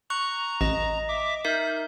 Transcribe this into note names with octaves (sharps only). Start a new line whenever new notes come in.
A#5 C#6 F#6
A1 D#5 A#6
E5 D6
D#4 A#4 E5 G6